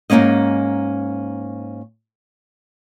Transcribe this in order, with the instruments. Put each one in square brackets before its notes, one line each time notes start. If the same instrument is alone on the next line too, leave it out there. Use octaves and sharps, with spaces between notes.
[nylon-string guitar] G#2 C#3 A#3 C#4 D#5